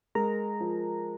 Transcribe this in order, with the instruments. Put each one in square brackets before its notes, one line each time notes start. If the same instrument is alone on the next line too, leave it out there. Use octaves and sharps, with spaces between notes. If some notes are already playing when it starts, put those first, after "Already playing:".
[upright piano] G#3 [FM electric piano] A#4 A#5
[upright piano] F3